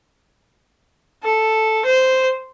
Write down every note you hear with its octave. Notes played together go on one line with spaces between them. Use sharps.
A4
C5